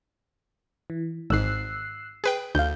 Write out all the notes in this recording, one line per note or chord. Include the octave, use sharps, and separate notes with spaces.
E3
G#1 G#2 E6 F#6 C7
G#4 B4 G5
D2 F5 G6